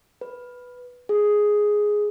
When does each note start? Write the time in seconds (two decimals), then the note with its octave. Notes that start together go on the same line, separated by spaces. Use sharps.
0.21 B4
1.09 G#4